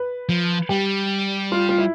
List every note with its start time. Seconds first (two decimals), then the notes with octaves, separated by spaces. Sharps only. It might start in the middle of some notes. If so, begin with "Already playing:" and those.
Already playing: B4
0.29 F3
0.69 G3 G4
1.52 F4
1.69 F4
1.78 E4